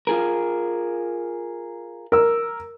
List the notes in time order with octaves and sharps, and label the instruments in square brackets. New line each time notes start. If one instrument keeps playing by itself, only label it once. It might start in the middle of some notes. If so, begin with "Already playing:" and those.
[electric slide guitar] F4 G#4 A#4
[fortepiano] A#4 E6